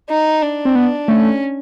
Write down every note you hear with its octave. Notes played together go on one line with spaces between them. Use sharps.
D#4
D4
C4
B3
A3 C#4